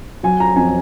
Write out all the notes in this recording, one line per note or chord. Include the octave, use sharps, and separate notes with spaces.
F#3 G#5
A#5
F2 G#5